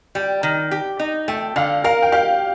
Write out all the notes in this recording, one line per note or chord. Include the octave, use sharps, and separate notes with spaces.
G3 G5
D#3
G4
D#4
A3 G5
D3 F5
A#4 F5
G5
G4 F5